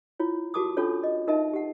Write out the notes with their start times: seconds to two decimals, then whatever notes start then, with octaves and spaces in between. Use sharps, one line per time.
0.20 E4 F4 C#5
0.54 F#4 G4 A#4 A5 D6 D#6
0.77 C#4 D4 F4 A4 C#5
1.03 D#5
1.27 D#4 A#4 D#5 E5 A5
1.53 G4 F#5